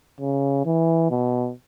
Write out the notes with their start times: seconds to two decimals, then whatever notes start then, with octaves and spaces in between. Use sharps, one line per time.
0.20 C#3
0.65 E3
1.10 B2